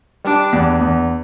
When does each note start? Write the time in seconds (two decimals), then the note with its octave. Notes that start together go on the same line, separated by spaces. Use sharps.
0.25 G3 D4
0.52 E2
0.81 E2